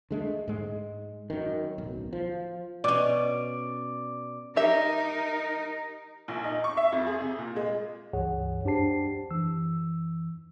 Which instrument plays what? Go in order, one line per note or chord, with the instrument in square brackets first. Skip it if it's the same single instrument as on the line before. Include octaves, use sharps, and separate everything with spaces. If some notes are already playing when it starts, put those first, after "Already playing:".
[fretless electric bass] D3 G#3 A3
G#2 G#3
F#2 D#3
D1 B1
F3
[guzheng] B2 C#4 [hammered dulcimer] D5
[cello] D#4 A#4 [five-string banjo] G4 E5
[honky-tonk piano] A#1
D#4
C#6
E5
F2
G#4
C3
A#2
G#3
[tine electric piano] C#2 G2 E3 G#4 C#5 F#5
F#2 D4 G4 C5 A5 C7
F#2 E3 E6